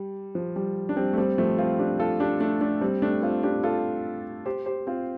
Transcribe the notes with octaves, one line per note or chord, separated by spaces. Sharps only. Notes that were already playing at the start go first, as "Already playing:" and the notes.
Already playing: G3
F3
G3
D4
G3 C4
A3
G3 C4
F3 A3
C4 F4
D4 G4
F4 A4
D4 G4
A3 D4
A3 D4
G3 C4
A3 D4
C4 F4
D4 G4
F4 A4
G4 C5
G4 C5
C4 F4